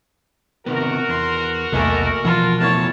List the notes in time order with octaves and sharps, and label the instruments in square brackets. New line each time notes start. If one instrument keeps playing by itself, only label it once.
[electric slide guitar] C3 D#3 B3 [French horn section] F#4 A#4
[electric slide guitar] E2 [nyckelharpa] C6
[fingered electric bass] B1 E2 C3 [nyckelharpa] A3 A#3 [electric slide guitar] A4 D#5 G#5
[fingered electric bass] B2 E3 F3 [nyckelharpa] F4 [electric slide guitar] F#5 A5
[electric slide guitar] A3 B3 E4 [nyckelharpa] C#5 A5